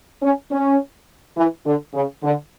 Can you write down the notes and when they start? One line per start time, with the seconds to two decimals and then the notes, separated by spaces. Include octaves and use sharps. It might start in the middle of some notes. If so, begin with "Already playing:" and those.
0.22 C#4
0.51 C#4
1.36 E3
1.65 D3
1.94 C#3
2.23 D3